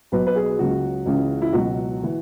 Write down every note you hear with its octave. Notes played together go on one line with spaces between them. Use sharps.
B1 B2 F#3 B4
B4
G#4
C#2 C#3 F#3 F#4
C#2 C#3 E3
E4
C#2 B2 F#3 F#4
E3